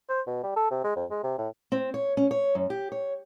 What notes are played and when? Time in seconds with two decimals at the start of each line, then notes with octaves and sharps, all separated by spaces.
0.09 C5
0.27 B2
0.43 G3
0.56 A4
0.71 C3
0.84 G#3
0.96 F2
1.10 G#3
1.24 C3
1.38 A2
1.72 C4
1.94 C#5
2.17 C#4
2.31 C#5
2.55 F#2
2.70 G4
2.92 C#5